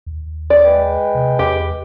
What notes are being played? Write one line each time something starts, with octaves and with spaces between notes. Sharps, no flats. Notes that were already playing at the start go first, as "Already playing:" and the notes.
D#2
D5
G#3 B4 G5
C3
E2 G4